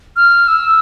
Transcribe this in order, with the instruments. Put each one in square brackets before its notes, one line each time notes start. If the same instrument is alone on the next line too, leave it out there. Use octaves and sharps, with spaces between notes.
[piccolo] F6
E6